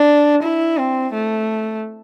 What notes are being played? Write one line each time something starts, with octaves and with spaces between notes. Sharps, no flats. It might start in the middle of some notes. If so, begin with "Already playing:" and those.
Already playing: D4
E4
C4
A3